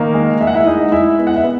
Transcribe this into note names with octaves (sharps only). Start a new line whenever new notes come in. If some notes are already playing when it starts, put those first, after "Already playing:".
Already playing: D#3 A#3 A#4
G#3
G#3 E5
F#5
E4 E5
G#3 D#4 D#5
G#3 E4 E5
B3
F#5
E5
B3